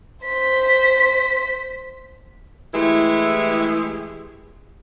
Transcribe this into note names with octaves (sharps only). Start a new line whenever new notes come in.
C5 B6
E3 G#3 A3 E4 G4 G#4